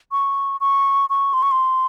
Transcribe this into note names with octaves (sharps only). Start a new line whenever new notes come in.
C#6
C#6
C#6
C6
C#6
C6